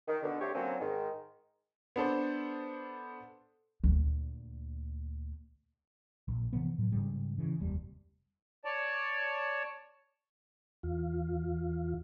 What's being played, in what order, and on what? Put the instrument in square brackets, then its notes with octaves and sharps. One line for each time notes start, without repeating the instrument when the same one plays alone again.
[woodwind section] D#3
B2 D3
D3 A3 C4 G4 C#5
D3 F#3 A#3 C4 C#4
G#2 D#3
[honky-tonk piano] B3 D4 A4 C5
[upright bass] D2 A#2
[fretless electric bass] A#1
C3 E3 F3 B3
A2 F#3
G#2 C#3 G3
C#3 E3
F1 D#2 G3
[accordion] C#5 D5 A5
[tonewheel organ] E2 F4